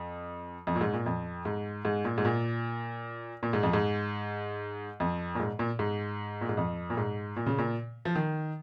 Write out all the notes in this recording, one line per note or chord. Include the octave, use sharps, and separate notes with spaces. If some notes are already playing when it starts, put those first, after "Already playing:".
Already playing: F2
F2
A#2
G#2
A#2
F2
G#2
G#2
A#2
G#2
A#2
A#2
G#2
F2
G#2
F2
A#2
G#2
A#2
G#2
A#2
G#2
F2
A#2
G#2
A#2
C#3
A#2
F3
D#3